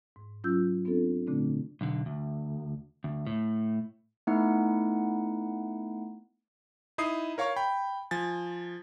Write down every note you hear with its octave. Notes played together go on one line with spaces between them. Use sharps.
G#2
F#3 C#4 F4 E6 G6
B3 C4 D4 F4 A4
A#2 D3 A3 C4 D4
B1 D3
D2
D2
A2
A3 B3 D#4 E4 F#5
D#4 E4 D#6 C7
A#4 C#5 F5 A#5 C#6
G5 B5
F3 G#5 A6